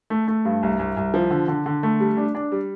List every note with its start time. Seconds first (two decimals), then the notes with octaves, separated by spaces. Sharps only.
0.10 A3
0.28 A3
0.45 G2
0.63 C2
0.79 C2
0.97 C2
1.14 F3
1.31 D3
1.48 D3
1.66 D3
1.83 A3
2.00 G3
2.17 D4
2.35 D4
2.52 G3